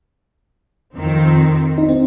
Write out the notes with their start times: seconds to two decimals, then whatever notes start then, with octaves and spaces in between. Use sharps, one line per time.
0.96 F2 D#3 C4
1.78 D#4
1.89 C4